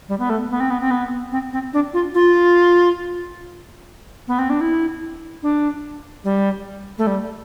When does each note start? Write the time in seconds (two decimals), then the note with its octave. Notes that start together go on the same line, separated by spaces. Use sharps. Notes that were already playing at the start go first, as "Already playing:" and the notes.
0.09 G3
0.19 B3
0.30 A3
0.51 B3
0.60 C4
0.70 B3
0.81 C4
0.91 B3
1.32 C4
1.53 C4
1.73 D4
1.94 F4
2.14 F4
4.28 B3
4.39 C4
4.50 D4
4.61 E4
5.43 D4
6.24 G3
6.98 A3
7.07 G3